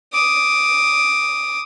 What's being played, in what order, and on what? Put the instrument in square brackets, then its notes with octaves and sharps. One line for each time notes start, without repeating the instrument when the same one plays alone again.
[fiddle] D6 D#6